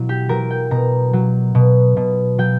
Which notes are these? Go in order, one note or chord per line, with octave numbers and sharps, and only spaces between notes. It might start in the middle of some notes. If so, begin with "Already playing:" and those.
Already playing: B2 F#3 E4
G4
F#3 A#4
G5
B2 A#5
F#3
B2
B2
F#3 G5